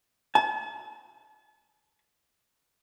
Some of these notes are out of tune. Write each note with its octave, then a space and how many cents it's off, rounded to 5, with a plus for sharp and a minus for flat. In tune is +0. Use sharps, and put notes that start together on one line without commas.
A5 -40